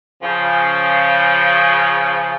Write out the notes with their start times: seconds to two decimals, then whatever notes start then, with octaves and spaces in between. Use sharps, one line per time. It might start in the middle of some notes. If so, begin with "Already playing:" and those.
0.23 C#3 F3